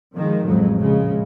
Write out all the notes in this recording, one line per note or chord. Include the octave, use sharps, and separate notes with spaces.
D#3 F3 G#3
A1 F2 F#3 G#3
A#1 C#3 G#3